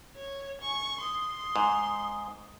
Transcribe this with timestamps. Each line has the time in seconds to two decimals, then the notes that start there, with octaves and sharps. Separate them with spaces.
0.16 C#5
0.61 G#5 C#6
1.01 C6 D#6
1.56 G#2